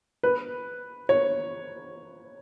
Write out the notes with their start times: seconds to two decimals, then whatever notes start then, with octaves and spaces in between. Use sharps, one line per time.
0.23 B4
1.09 C#5